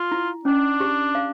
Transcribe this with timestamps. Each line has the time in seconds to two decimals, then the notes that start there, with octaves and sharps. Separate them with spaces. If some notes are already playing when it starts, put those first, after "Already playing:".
Already playing: F4
0.12 E4
0.45 C#4 D4
0.80 G4
1.15 F5